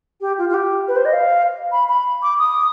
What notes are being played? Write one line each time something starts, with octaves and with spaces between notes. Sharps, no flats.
G4
F4
F4
G4
B4
C5
D#5
F5
B5
B5
D6
D#6